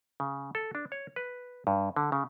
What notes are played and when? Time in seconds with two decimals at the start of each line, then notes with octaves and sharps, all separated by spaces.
0.20 C#3
0.55 A4
0.75 D4
0.92 C#5
1.16 B4
1.67 G2
1.96 D3
2.12 C#3